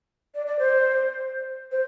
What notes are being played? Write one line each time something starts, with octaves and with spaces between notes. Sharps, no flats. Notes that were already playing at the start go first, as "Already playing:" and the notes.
D5
D5
C5
C5